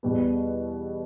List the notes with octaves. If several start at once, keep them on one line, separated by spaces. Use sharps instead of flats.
E2 B2 G3 B3